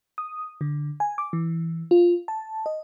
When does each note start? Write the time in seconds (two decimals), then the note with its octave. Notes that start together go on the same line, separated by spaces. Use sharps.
0.18 D#6
0.61 D3
1.00 G#5
1.18 D6
1.33 E3
1.91 F4
2.28 A5
2.66 D#5